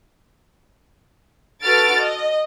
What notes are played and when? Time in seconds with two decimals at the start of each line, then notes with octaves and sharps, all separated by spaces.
1.63 F#4 A4 B4 F6 A6 D7
1.99 D#5